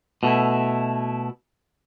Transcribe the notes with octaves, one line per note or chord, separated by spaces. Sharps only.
B2 A3 E4